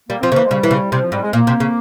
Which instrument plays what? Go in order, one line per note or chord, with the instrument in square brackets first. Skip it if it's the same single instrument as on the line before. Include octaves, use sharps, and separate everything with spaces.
[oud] G3 [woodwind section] A#3
[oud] F3 [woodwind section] C4
[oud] C#3 [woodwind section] A#3
[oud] E3
[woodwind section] G#3
[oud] C#3 [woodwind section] G3
[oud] E3
C#3
[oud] C3 [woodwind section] G3
[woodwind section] F3
[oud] G#2 [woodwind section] G3
[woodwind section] G#3
[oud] A#2 [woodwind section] A#3
[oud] C3
C#3